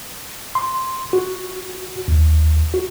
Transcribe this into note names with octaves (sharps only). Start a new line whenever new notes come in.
C6
F#4
D#2
F#4